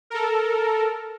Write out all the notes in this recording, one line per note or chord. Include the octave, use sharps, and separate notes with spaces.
A4 A#4